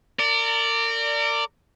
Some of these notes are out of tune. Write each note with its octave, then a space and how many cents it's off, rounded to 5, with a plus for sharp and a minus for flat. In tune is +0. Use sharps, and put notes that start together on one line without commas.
A#4 -35 D5 +0